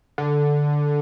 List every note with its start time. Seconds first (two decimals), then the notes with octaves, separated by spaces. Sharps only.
0.18 D3